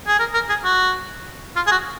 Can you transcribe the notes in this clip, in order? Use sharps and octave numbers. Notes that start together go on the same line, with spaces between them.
G#4
A#4
A#4
G#4
F#4
F4
G#4
F#4